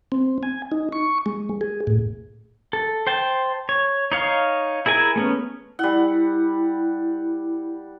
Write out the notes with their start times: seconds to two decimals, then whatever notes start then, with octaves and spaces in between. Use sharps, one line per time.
0.12 C4
0.43 G#5
0.71 D#4
0.92 C#6
1.26 G#3
1.61 G#4
1.87 A2
2.73 A4
3.07 C5 G5 A5
3.69 C#5
4.12 D#4 C#5 F5
4.86 E4 G#4 A#4 G#5
5.16 A3 B3 C#4
5.79 G3 E4 F#5